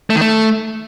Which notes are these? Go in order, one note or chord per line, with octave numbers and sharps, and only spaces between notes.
A3
D#3
A3